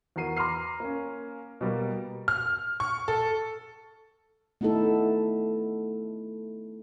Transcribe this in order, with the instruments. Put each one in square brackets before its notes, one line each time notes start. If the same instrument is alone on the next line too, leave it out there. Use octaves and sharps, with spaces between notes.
[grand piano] E2 F#4 A#4 C7 D#7
A#5 C6 D6 F6 C7
A#3 C#4
B2 G3 A#3
[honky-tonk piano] F6
C#6
A4
[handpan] A3 B3 D#4 E4 A4